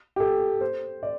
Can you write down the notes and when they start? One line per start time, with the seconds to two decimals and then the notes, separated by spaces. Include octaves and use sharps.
0.16 G4
0.20 A4
0.61 C5
1.03 D5